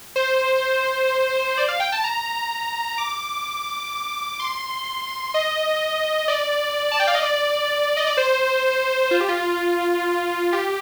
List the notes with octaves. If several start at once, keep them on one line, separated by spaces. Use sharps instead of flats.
C5
D5
F5
G5
A5
A#5
D6
C6
D#5
D5
A5
G5
F5
D#5
D5
D#5
D5
C5
F4
G4
F4
G4